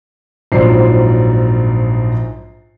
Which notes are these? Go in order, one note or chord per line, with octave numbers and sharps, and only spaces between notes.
A#1 G#2 F#3 C5 D5 C7